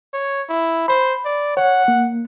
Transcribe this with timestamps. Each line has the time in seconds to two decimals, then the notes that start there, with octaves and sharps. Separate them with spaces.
0.13 C#5
0.49 E4
0.88 C5 B5
1.25 D5
1.57 C#5 F#5
1.88 A#3